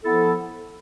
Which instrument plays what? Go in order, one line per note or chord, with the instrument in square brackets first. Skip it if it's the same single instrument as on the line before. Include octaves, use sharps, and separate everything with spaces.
[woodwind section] F3 B3 E4 A4